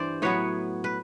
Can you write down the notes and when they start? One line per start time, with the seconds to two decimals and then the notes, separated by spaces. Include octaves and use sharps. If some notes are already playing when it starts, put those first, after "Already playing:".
Already playing: G2 E3 C5 D5
0.22 A2 F#3 B3 B4 C#5
0.84 B4